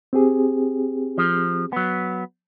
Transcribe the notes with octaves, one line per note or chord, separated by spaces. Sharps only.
C4 G4 G#4
F3
F#3 B3